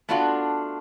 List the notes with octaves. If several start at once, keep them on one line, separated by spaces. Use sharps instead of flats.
A3 B3 D4 F4 F#4